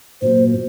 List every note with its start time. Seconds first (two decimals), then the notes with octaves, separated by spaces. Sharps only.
0.22 A#2 F#3 A#3 C5
0.54 A#2 A#3